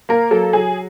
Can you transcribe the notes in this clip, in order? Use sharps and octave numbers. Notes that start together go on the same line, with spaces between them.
A#3 A#4
F#3 A4
F#3 G#4